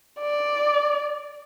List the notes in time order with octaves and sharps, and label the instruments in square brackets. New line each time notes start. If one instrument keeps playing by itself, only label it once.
[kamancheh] D5